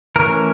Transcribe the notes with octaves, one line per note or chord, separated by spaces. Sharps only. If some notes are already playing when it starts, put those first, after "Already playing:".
E3 A3 C#4 A#4